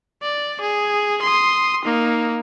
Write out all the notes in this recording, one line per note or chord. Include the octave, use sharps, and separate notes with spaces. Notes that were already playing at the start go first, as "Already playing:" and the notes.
D5
G#4
C6 D#6
A#3 D#4